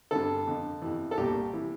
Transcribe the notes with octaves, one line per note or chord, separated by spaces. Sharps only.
G2 D3 A4
F2 D3
F2 C3 E3
A4
C2 A#2 G4
C3 E3